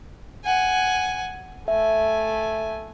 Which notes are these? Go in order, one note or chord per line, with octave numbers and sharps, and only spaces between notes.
F#5 G#5
A3 E5 G#5